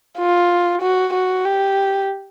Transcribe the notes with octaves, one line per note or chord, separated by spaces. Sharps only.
F4
F#4
F#4
G4